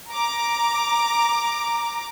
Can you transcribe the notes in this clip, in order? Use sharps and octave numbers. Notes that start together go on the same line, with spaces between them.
A#5 D6